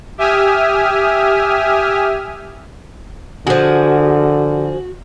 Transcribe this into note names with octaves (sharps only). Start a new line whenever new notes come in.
G4 E5 G#5 D#6 F6
D3 F3 F#4 G#4